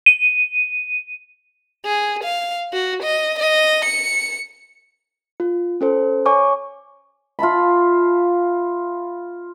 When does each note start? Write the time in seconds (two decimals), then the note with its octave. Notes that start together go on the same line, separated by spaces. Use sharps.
0.06 D#7
1.85 G#4
2.23 F5
2.73 F#4
3.02 D#5
3.39 D#5
3.85 C#7
5.40 F4
5.81 C#4 A4 C5
6.26 C#5 G#5 C#6 D6
7.39 F4 E5 A5 B5